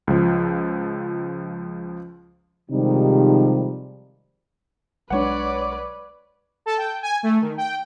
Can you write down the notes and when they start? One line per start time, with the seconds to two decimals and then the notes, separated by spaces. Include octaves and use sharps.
0.07 C#2 F3
2.71 C3 D#3 F3 G3 G#3 D#4
5.10 B1 G#3 D4 B4 C#5 D5 F#5
6.66 A4
6.78 G5
7.02 G#5
7.23 A3
7.41 D#3
7.57 G5